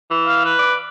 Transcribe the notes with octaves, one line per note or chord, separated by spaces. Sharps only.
E3
F5
B4
D5